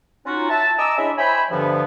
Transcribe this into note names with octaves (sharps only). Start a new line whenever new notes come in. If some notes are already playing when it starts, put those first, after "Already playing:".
C#4 D#4 F4 F#4
E5 A5
D#5 G#5 A#5 D6 E6
G#3 C#4 D4 E4 D#5 E5
C5 C#5 E5 G5 G#5 B5
G2 D3 F3 B3